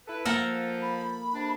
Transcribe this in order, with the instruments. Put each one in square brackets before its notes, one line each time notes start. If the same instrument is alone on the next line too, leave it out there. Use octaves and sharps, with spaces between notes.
[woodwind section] E4 A4 B4
[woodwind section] F3 [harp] A#3 [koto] A4 A#4 F#5
[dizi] B5
[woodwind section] F2 C3 D4